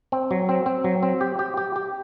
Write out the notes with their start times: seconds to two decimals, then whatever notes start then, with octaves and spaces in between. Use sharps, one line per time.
0.12 C4
0.31 F#3
0.49 C4
0.66 C4
0.84 F#3
1.03 C4
1.21 G4
1.39 G4
1.57 G4
1.76 G4